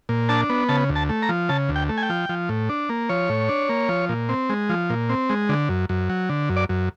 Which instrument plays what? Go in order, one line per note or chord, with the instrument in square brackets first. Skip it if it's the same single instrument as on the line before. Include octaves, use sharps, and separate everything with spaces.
[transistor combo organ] A#2
D4 A5
B3
C#3 A5
D2
A5
A3
A#5
F3
C#3 A5
D2
G5
A3
G#5
G5
F3
F3
A2
D4
A#3
F3 C#5
A2
D4
A#3
F3
A#2
C4
G#3
F3
A#2
C4
G#3
D3
F#2
F#2
F#3
D3
F#2
D5
F#2